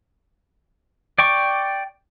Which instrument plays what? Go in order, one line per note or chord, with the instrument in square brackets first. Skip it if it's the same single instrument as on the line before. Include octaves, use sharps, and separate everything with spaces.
[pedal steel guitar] D5 G5 C#6 D6